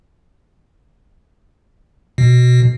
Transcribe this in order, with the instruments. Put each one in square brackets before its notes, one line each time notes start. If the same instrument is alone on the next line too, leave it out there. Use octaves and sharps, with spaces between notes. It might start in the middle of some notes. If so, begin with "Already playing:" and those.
[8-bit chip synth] B2